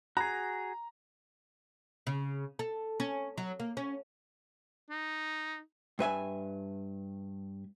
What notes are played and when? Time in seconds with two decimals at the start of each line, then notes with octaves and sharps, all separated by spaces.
0.17 F#4 G#4 A#5
2.07 C#3
2.59 A4
3.00 C#4
3.38 F#3
3.60 A#3
3.77 C#4
4.90 D#4
5.99 G2 B4 E5 G#5